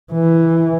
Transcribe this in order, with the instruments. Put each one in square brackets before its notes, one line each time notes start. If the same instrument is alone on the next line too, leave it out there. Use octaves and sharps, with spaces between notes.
[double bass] E3